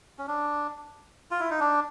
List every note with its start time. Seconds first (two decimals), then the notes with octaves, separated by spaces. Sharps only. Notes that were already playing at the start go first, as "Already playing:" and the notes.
0.19 C#4
0.27 D4
1.31 F4
1.40 E4
1.50 D#4
1.60 D4